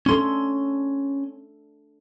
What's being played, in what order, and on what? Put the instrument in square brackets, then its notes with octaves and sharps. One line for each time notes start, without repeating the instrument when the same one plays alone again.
[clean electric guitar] C#4 C6 [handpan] D4 A4